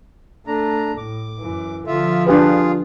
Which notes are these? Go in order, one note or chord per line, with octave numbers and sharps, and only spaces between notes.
A3 D4 A#5
A2 D6
F#2 E3
D3 F3 F4 E5
D4 F4 G4 G#4 B4